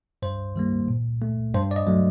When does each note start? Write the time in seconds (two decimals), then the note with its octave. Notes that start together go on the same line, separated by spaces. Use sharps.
0.22 G2 C5
0.56 D#3 G3 A#3
0.88 A#2
1.22 A3
1.54 G2 C5
1.71 D5
1.76 D#5
1.87 F#3 A3